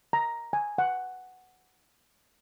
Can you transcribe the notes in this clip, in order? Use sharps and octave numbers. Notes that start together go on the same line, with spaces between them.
A#5
G#5
F#5